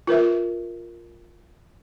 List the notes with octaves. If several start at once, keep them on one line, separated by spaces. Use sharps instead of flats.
F4 A#4 B4 E5